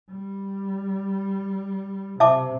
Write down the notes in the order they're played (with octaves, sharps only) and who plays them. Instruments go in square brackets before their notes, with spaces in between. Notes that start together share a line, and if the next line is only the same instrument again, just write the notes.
[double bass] G3
[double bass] C3 [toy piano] E5 A5 D6